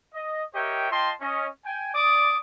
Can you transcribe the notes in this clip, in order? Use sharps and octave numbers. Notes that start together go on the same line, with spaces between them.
D#5
G4 A#4 C#5 D#5 E5 G5
F4 D#5 G5 A5 C6
C#4 D#5
G5 G#5
D5 D6 D#6